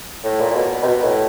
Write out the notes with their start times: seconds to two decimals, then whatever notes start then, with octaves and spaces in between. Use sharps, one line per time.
0.24 A2
0.40 A#2
0.51 A#2
0.56 B2
0.83 C3
0.88 B2
1.04 A2